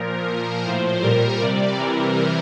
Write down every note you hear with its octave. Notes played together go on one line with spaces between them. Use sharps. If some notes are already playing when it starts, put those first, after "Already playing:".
Already playing: A#2 F3 A#4
A#2 F3
A2 F3 C5
A#2 G3 A#4
C3 G3 D5
C3 E3 G3 A#4